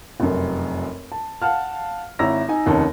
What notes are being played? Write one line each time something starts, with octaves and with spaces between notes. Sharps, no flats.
F1 F#2
A5
F5 F#5 A5 F6
G#1 E4 C#5 A#5 E6 A#6
D#4 G#5
F1 D#2 C#4 D#4 A5